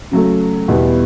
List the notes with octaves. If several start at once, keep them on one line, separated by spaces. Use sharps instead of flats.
C#3 F#3 A3
E2 B2 G3 B3 E4